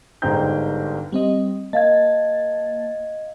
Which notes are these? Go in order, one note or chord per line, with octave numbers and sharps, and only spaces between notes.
G1 G#2 C5 G5 A#5 G6
G3 C4 D#5
A#3 D#5 F5 A5 G#6 A6